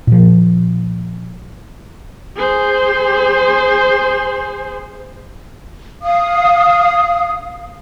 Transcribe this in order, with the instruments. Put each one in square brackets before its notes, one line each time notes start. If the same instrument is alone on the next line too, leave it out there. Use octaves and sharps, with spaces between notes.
[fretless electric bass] A#2 F3
[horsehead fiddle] G#4 C5
[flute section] F5 D#6